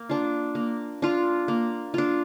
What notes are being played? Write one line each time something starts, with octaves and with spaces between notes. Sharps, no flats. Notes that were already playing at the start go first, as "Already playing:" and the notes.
Already playing: A#3
D4 F4
A#3
D4 F4
A#3
D4 F4